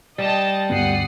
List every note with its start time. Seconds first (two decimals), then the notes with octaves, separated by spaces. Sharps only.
0.18 G3 D#5 A5
0.70 D2 G2 B3 F#5 D#6 C7